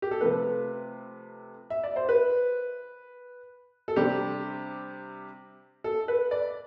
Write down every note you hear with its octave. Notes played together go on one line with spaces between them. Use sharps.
G4
A4
C3 F3 A3 B4
E5
D5
C5
B4
A4
C3 G3 D4 G4
A4
B4
D5